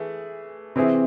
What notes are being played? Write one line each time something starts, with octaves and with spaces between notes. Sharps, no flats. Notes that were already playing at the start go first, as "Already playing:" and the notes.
Already playing: E3 A3 G#4
C3 E3 C4 E4 G#4